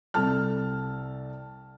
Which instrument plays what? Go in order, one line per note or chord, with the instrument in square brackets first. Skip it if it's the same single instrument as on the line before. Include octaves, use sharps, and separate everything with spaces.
[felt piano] C2 C4 A4 A5 F6